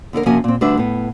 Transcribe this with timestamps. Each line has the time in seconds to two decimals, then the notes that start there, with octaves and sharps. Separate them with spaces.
0.13 D#2 D3 E4 A#4
0.26 C3 F3 A#3 C#4 F#4 G#5
0.44 A#2 C4
0.61 D2 G3 D4 B4 E5
0.77 A2 B3